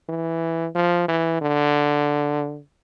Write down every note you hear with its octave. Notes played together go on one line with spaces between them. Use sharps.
E3
F3
E3
D3